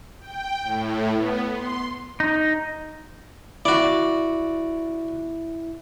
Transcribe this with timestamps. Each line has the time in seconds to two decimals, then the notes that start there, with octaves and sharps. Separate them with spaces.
0.20 G5
0.63 A2
1.15 B3
1.53 C6
2.20 D#4
3.65 E4 F#4 D5